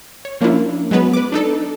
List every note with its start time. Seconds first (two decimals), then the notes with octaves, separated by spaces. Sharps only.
0.25 C#5
0.41 F3 A#3 C#4 D4 E4 F4
0.91 F#3 G#3 B3 B4
1.13 B4 D6
1.32 D4 D#4 A4